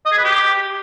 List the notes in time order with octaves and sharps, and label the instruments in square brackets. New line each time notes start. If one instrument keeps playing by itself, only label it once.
[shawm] D#5
G#4
B4
G4